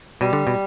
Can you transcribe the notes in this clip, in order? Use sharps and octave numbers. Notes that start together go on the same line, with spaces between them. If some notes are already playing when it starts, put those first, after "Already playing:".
B2 G3
D3
B2